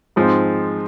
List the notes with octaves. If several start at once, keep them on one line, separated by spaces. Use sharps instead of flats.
G#2 F3 G#3 C4